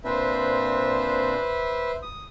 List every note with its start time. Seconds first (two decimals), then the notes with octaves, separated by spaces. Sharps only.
0.05 A#2 C4 D4 B4 C5 E5
2.02 D#6